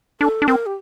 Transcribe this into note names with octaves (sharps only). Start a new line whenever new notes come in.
D4 A4
D4
C4 A#4
G4